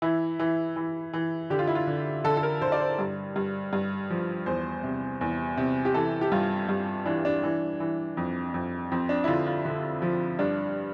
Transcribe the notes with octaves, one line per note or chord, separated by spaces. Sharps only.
E3 E4
E3
E3
E3
D3 G4
F4
E4
F4
D3
D3 A4
A4
A#4
D3 C5
D5
C5
G2
G2
G2
F3
E2 C5
C3
E2
C3
G4
E3 A4
G4
G2 F4
G2
E3 D4
D4
E3
E3
F2
F2
F2 C4
D4
E4
D3 F4
F4
D3
F3
G2 D4